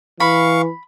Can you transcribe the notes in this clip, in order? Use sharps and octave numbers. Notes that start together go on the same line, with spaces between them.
E3 F5 B5 C#6